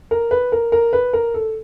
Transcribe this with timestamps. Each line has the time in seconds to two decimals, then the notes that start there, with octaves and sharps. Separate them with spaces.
0.11 A#4
0.31 B4
0.52 A#4
0.72 A#4
0.93 B4
1.13 A#4
1.34 A4